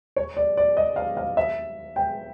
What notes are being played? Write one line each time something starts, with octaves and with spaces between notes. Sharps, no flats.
C#5
D5
D5
D#5
F5
F5
E5
G5